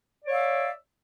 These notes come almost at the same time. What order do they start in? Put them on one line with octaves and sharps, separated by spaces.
D5 C#5 F5 E5